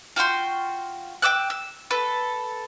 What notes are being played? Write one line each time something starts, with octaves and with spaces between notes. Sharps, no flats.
F4 F#4 G5 C6
G5 D6 E6 F#6
E6
A4 B4